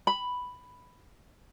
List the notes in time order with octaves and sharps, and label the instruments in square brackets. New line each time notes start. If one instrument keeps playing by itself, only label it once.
[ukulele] B5